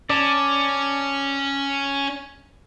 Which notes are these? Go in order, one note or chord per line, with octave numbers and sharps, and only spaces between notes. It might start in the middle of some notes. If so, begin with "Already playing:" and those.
C#4 D5 A5